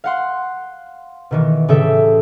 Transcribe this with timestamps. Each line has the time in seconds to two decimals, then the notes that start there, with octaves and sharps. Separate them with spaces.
0.04 F5 F#5 C6
1.31 B2 D#3 E3
1.68 A2 C#3 G4 A4 E5